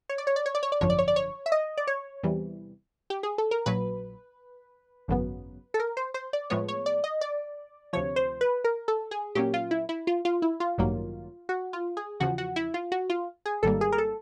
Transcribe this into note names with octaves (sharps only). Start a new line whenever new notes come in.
C#5
D5
C#5
D5
C#5
D5
C#5
D5
G#1 F#2 D3 F3 C#5
D5
C#5
D5
C#5
E5
D#5
D5
C#5
E2 C3 E3 G3
G4
G#4
A4
A#4
A#1 A#2 F#3 B4
G#1 F#2 C#3 F#3 B3
A4
A#4
C5
C5
D5
A2 F3 G#3 B3 C#5
C#5
D5
D#5
D5
D2 C3 F3 C#5
C5
B4
A#4
A4
G#4
A#2 F#3 A#3 C#4 G4
F4
E4
E4
F4
F4
E4
F4
A1 G2 D#3 F#3 A#3
F#4
F4
G#4
E2 C#3 F3 F#4
F#4
E4
F4
F#4
F4
G#4
G#1 G#2 D#3 G3 A#3 A4
G#4
A#4
A4